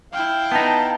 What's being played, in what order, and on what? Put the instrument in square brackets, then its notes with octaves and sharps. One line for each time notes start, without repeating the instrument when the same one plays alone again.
[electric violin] E4 G5 [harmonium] F5
[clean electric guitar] B3 D#4 [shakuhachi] A5